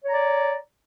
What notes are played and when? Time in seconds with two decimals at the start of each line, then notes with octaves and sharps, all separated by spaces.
0.04 C#5
0.08 A#5
0.12 D5